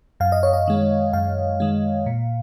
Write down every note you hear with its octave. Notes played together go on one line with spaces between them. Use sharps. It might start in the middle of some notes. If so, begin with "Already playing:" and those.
F#2 F5
D#5
C#5
D#5
D#3 G#3
F#2 F5
D#3 G#3
A#2